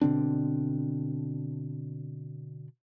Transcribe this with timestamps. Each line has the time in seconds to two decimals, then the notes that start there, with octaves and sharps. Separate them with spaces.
0.01 B2 D3 C4 D4